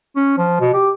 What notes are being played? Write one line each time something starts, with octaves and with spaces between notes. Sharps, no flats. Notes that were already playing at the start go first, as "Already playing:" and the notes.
C#4
F3
B2
G4